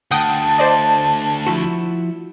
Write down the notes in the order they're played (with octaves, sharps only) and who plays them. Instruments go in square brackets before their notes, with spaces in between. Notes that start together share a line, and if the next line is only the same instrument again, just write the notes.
[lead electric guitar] D2 [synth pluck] F#5 G5 D#6 [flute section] A5
[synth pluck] C5 D5 D#5
[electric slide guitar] F3 E4 F#4